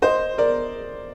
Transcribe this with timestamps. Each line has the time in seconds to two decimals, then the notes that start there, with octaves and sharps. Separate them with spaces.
0.02 C5 D#5
0.38 A#4 D5